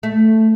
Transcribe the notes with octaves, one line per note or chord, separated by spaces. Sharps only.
A3